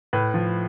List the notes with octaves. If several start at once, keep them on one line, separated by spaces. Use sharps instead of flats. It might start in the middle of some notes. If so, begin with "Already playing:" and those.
A2 B4
F3